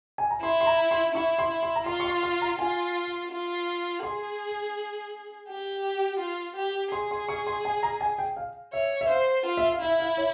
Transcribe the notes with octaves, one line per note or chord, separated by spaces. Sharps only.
G#5
A#5
E4 C6
C6
A#5
C6
E4 C#6
C6
E4
C6
A#5
F4 C6
C#6
C6
C6
A#5
F4 G#5
F4
G#4 C6
G4
F4
G4
G#4 C6
C6
C#6
C6
G#5
A#5
G#5
G5
F5
C#5 E5
E5
C5 F5
F4
E5
F5
E4 E5
F5
C#5